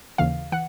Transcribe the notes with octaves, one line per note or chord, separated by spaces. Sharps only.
D#2 C#3 E3 F5
E3 F#5